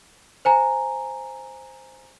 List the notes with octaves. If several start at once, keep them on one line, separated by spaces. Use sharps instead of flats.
C5 G#5 A#5